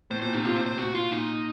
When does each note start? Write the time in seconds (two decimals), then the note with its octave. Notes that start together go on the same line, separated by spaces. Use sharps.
0.11 A2 C5
0.21 A#2 C5
0.33 C3 D#4
0.44 C3 F4
0.56 C5
0.66 C5
0.78 A#2 F#4
0.95 F4
1.11 A#2 D#4